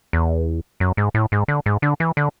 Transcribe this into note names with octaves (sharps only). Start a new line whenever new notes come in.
E2
F#2
G#2
A2
G#2
D3
G#2
D3
E3
D3